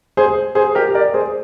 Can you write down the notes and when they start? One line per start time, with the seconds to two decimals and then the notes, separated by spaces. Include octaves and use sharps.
0.17 G#4 C5
0.55 G#4 C5
0.75 G4 A#4
0.94 A#4 D5
1.14 G#4 C5